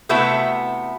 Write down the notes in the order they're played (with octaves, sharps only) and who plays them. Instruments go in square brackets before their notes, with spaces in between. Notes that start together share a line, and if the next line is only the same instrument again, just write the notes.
[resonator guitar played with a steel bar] C3 A3 B3 E4 F#4 E5